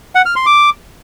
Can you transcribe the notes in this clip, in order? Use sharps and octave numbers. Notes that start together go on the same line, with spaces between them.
F#5
F6
C6
D6